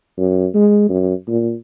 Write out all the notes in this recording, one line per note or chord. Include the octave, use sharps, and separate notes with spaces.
F#2
G#3
F#2
A#2